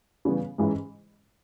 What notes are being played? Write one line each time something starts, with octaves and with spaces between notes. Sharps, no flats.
C#3 E3 G3 B3
G#2 E3 G#3 C#4 E4